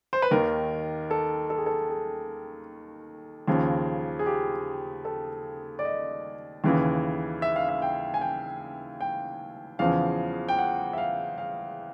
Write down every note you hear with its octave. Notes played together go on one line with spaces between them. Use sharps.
C5
B4
D#2 D#3 A#4
A4
A4
G#4
A4
G#4
D#2 C#3 F3
G#4
G4
A4
D5
D#5
D#2 C#3 E3
E5
F5
E5
G5
G#5
G5
G5
E2 C#3 F3 F5
G5
F#5
E5
F5
F5